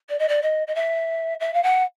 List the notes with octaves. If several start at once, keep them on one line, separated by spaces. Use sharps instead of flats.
D5
D#5
D5
D#5
D#5
E5
E5
F5
F#5